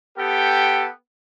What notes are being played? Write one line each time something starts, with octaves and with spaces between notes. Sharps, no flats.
B3 G4 A4 G5